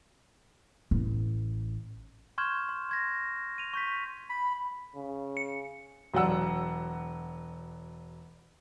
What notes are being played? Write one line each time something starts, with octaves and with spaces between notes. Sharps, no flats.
A1
C6 C#6 F6 G6 G#6 E7
C6
C6 G#6 A#6
D#7 F7
C#6 G6 B6
B5
C#3
C#7
E1 F#3 D5 F#5 E6